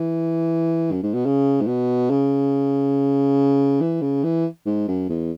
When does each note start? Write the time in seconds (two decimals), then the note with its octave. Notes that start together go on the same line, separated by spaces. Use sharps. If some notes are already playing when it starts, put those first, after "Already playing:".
Already playing: E3
0.92 F#2
1.03 G#2
1.14 B2
1.26 C#3
1.61 G#2
1.67 B2
2.10 C#3
3.81 E3
4.02 C#3
4.24 E3
4.66 G#2
4.88 F#2
5.09 E2